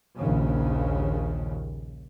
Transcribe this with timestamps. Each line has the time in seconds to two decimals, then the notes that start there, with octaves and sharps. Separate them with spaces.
0.17 A#1 D#2 C#3